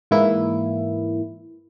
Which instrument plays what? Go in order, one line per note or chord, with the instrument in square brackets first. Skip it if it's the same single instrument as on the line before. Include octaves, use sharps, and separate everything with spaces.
[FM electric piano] G#2 E3 A#3 E4